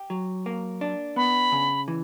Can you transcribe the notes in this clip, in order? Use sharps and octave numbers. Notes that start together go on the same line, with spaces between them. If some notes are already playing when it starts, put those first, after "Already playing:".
Already playing: G4
F#3
A#3
D4
B3 B5
C#3
E3